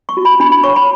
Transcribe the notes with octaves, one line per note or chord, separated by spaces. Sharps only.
C#6
F#4
B5
D4 B5
B5
C#5 C#6
B5